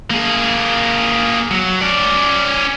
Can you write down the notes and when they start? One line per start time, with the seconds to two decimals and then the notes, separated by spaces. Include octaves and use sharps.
0.11 A#3 G#4
1.51 F#3
1.81 C#4 D5